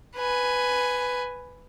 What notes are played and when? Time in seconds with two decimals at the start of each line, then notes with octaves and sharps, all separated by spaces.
0.16 B4 G#5